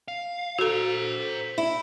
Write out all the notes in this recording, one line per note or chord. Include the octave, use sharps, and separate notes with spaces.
F5
F#4 A4 C5 A#5
E4